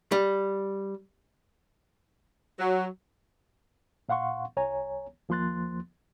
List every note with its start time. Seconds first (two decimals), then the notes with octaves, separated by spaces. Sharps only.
0.12 G3
2.59 F#3
4.09 A#2 F5 F#5 C6 C#6
4.57 C2 C#5 G#5 A#5
5.29 D#2 F3 A#3 C6 F#6 A6